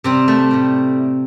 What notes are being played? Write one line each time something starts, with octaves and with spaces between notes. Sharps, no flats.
C3 G3 C4
A3
A2 G3